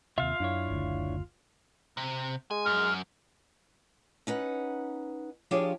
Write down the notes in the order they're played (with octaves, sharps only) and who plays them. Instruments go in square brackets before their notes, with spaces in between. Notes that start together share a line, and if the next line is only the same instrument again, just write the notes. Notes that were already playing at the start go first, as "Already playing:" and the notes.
[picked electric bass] D#2 C3 [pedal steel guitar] F4 F5 [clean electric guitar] E5
[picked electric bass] F#2 [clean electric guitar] D4 E4 C#5
[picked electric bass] F#1 D2
[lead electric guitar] C3
[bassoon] G#3 [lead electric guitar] G#5
[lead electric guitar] F#2 [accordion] F6
[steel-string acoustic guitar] C#4 D#4 B4 F#5
F3 D4 F4 G4 G#4 C#5